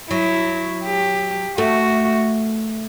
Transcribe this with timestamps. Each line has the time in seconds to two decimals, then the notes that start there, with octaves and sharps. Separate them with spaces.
0.11 F#3 E4
0.85 G4
1.58 A3 F#4